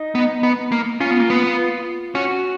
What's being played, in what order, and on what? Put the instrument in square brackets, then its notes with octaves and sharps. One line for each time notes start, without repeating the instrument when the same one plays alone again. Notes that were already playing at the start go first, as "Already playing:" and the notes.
Already playing: [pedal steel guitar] D#4
[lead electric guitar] B3
B3
A#3
[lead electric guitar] C#4 [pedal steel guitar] F4
[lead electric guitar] B3
A#3
B3
[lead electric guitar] C#4 [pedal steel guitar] F#4